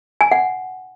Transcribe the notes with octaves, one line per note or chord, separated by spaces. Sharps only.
G#5
F#5